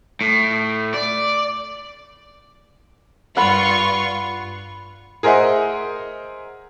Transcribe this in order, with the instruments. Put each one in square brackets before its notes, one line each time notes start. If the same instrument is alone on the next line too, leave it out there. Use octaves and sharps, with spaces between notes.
[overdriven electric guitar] A2
D5
[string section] G2 F4 C#6 [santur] F#5 B5
[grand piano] G#4 A#4 C5 D#5 E5 F#5